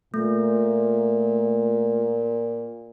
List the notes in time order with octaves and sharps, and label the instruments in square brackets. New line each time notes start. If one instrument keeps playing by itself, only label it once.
[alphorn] A#2 [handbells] A3